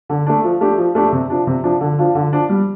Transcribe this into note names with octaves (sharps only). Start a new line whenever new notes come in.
D3
A3 D4
F3
A3 D4 G4
F3
A3 D4 G4
C3
F3 D4
C3
F3 D4
D3
F3 D4 F4
D3
F3 D4 F4
G3